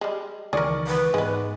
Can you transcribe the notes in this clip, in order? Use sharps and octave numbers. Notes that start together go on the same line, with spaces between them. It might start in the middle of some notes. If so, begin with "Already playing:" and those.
G3 G#3
C#2 D#3 E3 G#4 A#4 D5 C#6
B4
G#2 G#3 B3